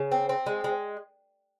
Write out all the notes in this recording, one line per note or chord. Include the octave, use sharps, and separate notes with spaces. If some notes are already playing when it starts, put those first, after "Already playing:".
Already playing: C#3
C4
C4
G#3
G#3